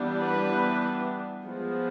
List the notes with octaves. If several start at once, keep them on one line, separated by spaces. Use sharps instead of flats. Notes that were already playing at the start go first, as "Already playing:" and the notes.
Already playing: E3 G3 B3 D4
B4
F3 G#3 B3